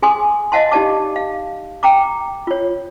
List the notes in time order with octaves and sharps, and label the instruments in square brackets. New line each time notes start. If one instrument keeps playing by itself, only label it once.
[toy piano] G#4 G#5 C6 D#6
D#5 F5 F#5 A5 C6
D#4 G4 D5 A5 D6
F5
G5 A#5 D6
F4 C#5